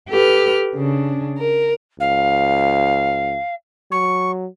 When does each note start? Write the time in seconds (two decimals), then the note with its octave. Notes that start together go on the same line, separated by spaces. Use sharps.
0.10 G4 A4 B4 F6
0.75 C#3 D4
1.36 A#4
2.00 C#2 F5
3.91 F#3 C#6